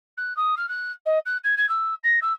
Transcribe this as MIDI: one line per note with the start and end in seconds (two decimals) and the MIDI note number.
0.17 0.35 90
0.36 0.55 87
0.57 0.68 89
0.68 0.92 90
1.05 1.18 75
1.26 1.37 90
1.44 1.54 92
1.57 1.68 92
1.69 1.94 88
2.03 2.19 94
2.21 2.33 88